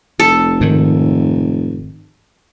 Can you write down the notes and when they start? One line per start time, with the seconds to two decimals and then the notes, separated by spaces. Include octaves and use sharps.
0.20 F1 A4
0.61 G#2 D#3